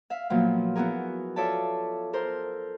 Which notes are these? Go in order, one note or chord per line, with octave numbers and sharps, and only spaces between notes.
E5 F5
A#2 F3 F#3 A#3 B3
B3 E4 F#4 G#4 A#4
F4 A4 C#5 D5 E5 A5
A4 A#4 C5